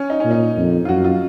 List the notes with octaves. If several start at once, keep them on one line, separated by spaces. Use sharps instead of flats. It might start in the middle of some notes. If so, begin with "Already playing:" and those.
Already playing: C#4
D#4
A#2 C#4
D#4
F2
F4
F#2 F#4
F4